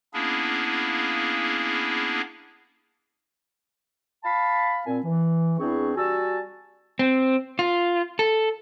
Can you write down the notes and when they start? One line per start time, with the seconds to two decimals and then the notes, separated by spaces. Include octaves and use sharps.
0.13 A#3 B3 C#4 D4 E4 G#4
4.24 F5 A5 B5
4.87 A#2 C4 G#5
5.04 E3
5.60 E2 C4 D4 E4 G#4 C#6
5.96 G3 F#4 G#5 A5 E6
6.99 C4
7.59 F4
8.19 A4